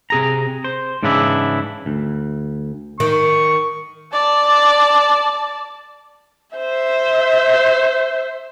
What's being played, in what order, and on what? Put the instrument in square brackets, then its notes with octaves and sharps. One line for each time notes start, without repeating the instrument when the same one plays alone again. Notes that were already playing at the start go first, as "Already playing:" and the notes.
[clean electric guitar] C3 G#4 A#5
C5
G#2 C#3 E3 D4 E4
D2
[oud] D#3 [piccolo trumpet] C#6
[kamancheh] D5 A5
C5 E5